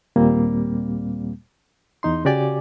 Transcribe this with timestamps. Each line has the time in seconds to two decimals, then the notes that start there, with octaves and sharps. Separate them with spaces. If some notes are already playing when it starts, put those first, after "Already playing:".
0.16 D#2 A#2 G3 A#3 C4
2.03 E2 D#4 C6
2.25 C#3 F#4 G4 D5 G#5 D6